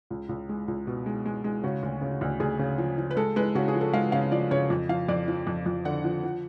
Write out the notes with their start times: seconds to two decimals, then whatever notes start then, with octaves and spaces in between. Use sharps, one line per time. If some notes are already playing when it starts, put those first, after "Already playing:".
0.11 C#2
0.29 C#2
0.49 G#3
0.68 C#2
0.87 B2
1.06 G#3
1.26 G#3
1.44 G#3
1.63 C#3 F#4
1.83 D2
2.02 C#3
2.21 D2
2.40 D2 G#4
2.59 C#3
2.78 F3
2.98 F3
3.11 B4
3.16 G#3 A4
3.36 G#3 B4
3.55 C#3 F#4
3.68 G#4
3.74 F3
3.81 A4
3.93 G#3 F5
4.12 C#3 F5
4.32 F3 D5
4.51 C#3 C#5
4.70 F2
4.89 F3 F5
5.09 F2 D5
5.28 F3
5.47 F2
5.66 F2
5.85 D3 F#5
6.04 F3
6.23 F3